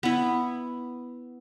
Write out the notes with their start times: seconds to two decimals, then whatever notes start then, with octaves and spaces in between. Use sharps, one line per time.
0.03 B3 E4